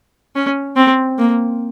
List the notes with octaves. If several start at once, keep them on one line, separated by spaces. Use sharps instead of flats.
C#4
C4
A#3